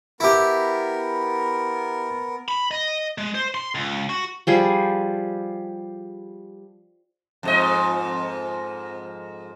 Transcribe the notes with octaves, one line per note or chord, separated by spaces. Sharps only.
B3 E4 G4 A#4
B5
D#5
G#3
C5
C6
C#2
F#4
F3 G3 G#4
F2 G#2 D#5